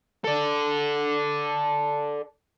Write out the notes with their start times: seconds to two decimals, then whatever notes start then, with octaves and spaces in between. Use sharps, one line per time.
0.24 A4 D5